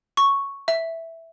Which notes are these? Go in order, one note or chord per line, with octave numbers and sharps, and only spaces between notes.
C#6
E5